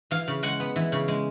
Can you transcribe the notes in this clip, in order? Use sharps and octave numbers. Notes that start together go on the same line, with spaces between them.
E3 F5
C#3
G#3 F#5
B3
E3
C#3
G#3